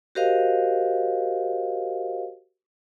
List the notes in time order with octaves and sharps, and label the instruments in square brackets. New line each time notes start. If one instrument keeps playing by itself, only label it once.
[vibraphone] F#4 G4 A#4 C5 D#5 F5